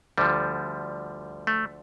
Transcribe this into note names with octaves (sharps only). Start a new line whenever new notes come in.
D2 D3 F3 G3
A3